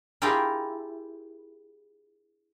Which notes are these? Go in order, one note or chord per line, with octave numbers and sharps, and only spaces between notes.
E4 F4 G4 G#4 A#4